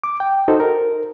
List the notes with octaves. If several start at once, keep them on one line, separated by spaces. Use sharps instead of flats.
D6
G5
D#4 F#4 A4 C5
A#4